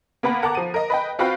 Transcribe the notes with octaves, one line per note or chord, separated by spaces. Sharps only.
A#3 B3 B4 F#5
A#4 F#5 A5 A#5 D6
F3 D#7
A#4 D#5
B4 D#5 G5
C4 F4 F#4 B4 F5 G5